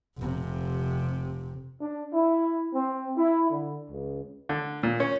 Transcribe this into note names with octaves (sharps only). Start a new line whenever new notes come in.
F1 C3
D4
E4
C4
E4
D3
C#2
D3
A#2
C#4